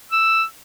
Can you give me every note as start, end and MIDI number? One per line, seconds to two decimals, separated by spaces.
0.12 0.44 88